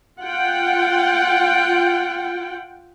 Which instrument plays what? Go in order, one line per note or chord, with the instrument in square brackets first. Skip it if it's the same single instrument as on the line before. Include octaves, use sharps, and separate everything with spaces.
[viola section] F4 F#5 G5